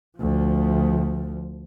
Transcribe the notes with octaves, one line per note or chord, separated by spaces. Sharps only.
D2 F3